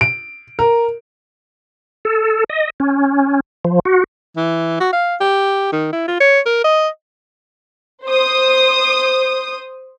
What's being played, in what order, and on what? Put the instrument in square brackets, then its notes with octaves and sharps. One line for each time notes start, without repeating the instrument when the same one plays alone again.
[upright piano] D7
A#4
[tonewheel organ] A4
D#5
C#4
F3
F#4
[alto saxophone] E3
F#4
F5
G4
D#3
E4
F4
C#5
A#4
D#5
[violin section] C5 D#6